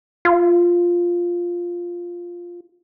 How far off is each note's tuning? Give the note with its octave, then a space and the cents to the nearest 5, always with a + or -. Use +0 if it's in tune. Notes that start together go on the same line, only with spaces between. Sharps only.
F4 +0